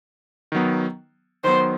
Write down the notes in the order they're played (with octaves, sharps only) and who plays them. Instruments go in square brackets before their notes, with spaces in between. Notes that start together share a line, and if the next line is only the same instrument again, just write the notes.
[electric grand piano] D#3 F#3 B3
[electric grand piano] D#3 F#3 B3 [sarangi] C5